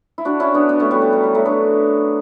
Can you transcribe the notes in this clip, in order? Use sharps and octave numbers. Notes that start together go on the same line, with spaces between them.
E4
D4 F#4
C#4 E4
B3 D4
B3 D4
A3 C#4
G3 B3
G3
F#3
G3
F#3 A3
B3 D4